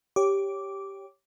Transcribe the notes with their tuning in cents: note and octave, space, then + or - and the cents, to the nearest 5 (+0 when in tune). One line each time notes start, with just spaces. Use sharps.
G4 +0 C#5 +0 D6 -10